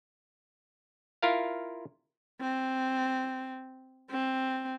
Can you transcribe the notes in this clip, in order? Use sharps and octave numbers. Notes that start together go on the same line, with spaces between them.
E4 F4 A#4 F5
C4
C4